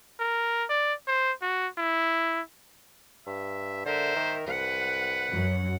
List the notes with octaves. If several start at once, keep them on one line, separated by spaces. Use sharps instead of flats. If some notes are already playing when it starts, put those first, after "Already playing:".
A#4
D5
C5
F#4
E4
G2 E5
D3 A#4 C5 E5
D#3
C2 B4 F#5
F#2 F#3